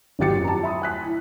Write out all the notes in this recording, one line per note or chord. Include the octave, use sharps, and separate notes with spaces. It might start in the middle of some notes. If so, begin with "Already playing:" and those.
G#1 F3 F#3 G4 A6 C#7
F#2
A5 A#5
E5 B5 D#6
G#5 F#6 B6
E4